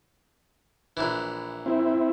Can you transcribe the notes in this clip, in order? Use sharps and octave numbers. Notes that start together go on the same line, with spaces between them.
A#1 E3
C4 E4